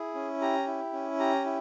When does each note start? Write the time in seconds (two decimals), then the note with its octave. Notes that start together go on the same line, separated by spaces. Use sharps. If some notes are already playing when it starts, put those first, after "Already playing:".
Already playing: E4 G#4
0.15 C#4
0.41 G4 A#5
0.67 E4
0.93 C#4
1.19 G4 A#5
1.45 E4